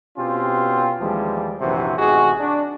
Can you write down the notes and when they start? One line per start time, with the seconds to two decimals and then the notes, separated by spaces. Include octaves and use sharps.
0.17 B2 C4 C#4 F4 G4
1.00 D#2 E3 F3 G3 G#3
1.60 A#1 F#2 C3 E3 F#4 C5
1.98 A1 C3 D#4 F#4 G#4
2.40 D4